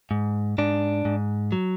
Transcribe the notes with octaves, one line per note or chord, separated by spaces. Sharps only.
G#2
G#2 D4
G#2
F#3